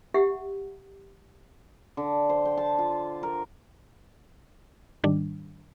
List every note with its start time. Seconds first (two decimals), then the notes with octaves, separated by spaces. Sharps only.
0.14 G4 E5 F#5
1.97 D3
2.29 C5
2.45 G5
2.57 A5
2.79 F4
3.23 A#4
5.04 G#2 D#3 G3 D4